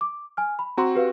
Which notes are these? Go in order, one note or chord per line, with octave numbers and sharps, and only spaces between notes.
D6
G#5 F6
B5
C4 F#4 A#5 C6
G4 B4 F5